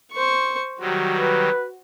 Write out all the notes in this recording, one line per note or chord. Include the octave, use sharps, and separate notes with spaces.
C5 C#6
D#3 F#3 G3 F#4
B4